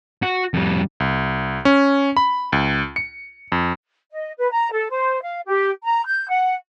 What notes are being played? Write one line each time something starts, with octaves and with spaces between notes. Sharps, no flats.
F#4
F2 G3
C2
C#4
B5
C#2
C#7
F2
D#5
B4
A#5
A4
C5
F5
G4
A#5
G6
F#5